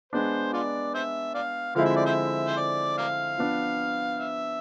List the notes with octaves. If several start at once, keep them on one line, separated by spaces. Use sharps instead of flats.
G#3 B3 D4 C5
F4 D5
C5 E5
D5 F5
D3 F3 G#3 C4 E4 F5
E5
D5
C5 E5
C5
D5
D5 F5
F3 B3 D4
E5